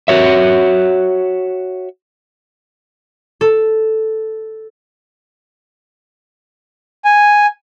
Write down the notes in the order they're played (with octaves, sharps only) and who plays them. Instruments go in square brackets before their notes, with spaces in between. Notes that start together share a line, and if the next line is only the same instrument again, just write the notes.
[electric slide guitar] F#4 C#5 E5
[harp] A4
[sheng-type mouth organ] G#5